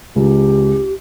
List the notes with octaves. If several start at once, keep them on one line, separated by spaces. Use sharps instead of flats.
C#2 G4